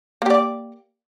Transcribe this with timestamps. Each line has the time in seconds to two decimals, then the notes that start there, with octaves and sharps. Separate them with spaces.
0.22 A#3
0.26 G4
0.30 D5